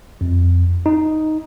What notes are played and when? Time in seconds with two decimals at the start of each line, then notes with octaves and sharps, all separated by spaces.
0.21 F2
0.86 D#4